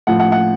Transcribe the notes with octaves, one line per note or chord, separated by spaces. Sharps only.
A2 F3 F#5
F#5
F#5